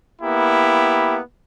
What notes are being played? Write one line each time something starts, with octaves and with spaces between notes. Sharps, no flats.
A#3 B3 E4 G4